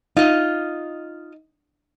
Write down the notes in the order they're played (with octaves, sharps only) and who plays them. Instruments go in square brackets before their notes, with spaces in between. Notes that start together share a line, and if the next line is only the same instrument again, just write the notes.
[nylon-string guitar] D#4 [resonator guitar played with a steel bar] F4 D#5